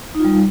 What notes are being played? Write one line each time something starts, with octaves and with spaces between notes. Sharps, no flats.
G3 D#4 F4